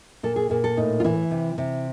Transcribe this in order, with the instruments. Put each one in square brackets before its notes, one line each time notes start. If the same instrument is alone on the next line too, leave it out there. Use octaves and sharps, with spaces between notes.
[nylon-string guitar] A#2 A4
G#4
A#2 G#4
A4
A2 D#4
F4
E3 E4
C3
C3